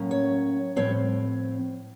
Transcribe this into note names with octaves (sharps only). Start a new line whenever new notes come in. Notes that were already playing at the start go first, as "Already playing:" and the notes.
Already playing: A2 F#3 A#3 C#4
C#5
A2 F3 C4 C#5